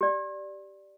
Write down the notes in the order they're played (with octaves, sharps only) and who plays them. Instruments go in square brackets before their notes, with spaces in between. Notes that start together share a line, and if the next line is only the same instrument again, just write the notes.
[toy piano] G4 D5